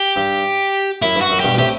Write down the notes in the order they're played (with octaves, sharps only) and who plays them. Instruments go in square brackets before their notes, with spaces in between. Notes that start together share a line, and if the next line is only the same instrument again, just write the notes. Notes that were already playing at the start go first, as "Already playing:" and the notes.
Already playing: [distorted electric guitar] G4
[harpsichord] G2
[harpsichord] F#2 [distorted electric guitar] E4
[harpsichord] G2
[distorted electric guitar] F#4
[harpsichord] F#2
[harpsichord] G2 B2 [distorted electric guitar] G4
[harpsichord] B2
[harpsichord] A2 C3 [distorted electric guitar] G4